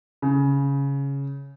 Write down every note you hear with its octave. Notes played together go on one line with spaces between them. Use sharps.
C#3